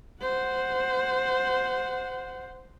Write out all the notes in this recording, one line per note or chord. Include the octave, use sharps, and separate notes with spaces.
C5 F#5